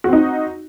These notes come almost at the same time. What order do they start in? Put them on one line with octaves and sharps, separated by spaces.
F#4 C4 D#4